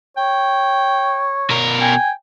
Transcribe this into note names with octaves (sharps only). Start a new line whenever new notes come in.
C#5 G5
B2 A#4
G5 G#5